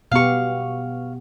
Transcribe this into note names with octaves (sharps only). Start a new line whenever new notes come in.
B2 B3 G4 F5 C#6